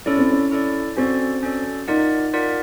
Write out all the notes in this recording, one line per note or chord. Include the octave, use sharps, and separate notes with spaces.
C#4 E4 A4 D5
C4
C#4
E4 A4 D5
C4 C#4 F#4 A4 D5
C#4 F#4 A4 D5
D#4 F4 A#4 D5 F#5
F4 A#4 D5 F#5